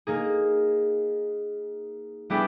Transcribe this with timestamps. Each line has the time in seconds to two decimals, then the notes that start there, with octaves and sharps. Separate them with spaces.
0.07 A#3 D#4 G#4
2.30 G3 B3 D4 E4 G4 G#4